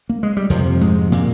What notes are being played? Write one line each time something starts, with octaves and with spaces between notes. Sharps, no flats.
A#3
G#3
G3
F2 C3 F3
G#2 G#3
A#2 A#3